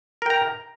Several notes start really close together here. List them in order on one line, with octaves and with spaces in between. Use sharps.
A#4 G5 A#5